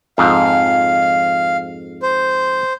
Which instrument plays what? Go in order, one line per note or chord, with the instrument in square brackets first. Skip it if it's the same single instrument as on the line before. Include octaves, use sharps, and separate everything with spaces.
[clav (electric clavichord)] F2 G#2 [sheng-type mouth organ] F5
[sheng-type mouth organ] C5